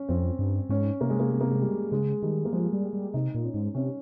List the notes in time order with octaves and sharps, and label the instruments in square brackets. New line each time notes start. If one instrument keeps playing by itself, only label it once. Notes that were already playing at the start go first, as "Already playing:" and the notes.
Already playing: [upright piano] C#4
[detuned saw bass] F2 [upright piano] C4
[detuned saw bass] G2
[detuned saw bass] G#2 [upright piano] C#4
[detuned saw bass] C3 [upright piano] A#3
[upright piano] G#3
A#3
G#3
A#3
G#3
G3
[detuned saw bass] C#3 [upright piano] G#3
[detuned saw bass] D#3 [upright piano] G3
[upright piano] A#3
[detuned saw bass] F3 [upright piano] G#3
[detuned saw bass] G3
G3
[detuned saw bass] C3 [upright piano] D#4
[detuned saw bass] A#2
[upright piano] C#4
[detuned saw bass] G#2
[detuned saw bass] C3 [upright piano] C#4